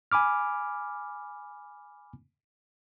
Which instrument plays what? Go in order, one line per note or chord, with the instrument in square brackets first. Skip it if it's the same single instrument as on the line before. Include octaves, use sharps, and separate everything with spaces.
[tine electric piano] G#5 B5 D6 F6